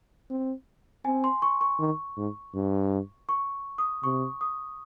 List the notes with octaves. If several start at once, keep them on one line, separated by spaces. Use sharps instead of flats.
C4
C4 G#5
C6
C#6
C#6
D#3
G#2
G2
C#6
D#6
C3 C#6
D#6